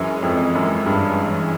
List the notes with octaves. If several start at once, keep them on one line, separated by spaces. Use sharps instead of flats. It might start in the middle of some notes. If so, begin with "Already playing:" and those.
Already playing: F#2 E3 G#3 C#4
F2
F#2
G2